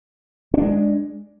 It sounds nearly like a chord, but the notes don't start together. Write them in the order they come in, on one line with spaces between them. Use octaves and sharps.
C#4 D4 G#3